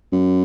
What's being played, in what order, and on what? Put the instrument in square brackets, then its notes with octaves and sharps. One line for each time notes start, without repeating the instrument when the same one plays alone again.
[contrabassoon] F#2